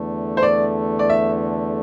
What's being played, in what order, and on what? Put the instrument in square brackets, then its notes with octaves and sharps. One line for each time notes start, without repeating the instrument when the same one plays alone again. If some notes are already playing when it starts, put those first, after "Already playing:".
Already playing: [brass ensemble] E2 D3 A3
[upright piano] C5
D5
D5
E5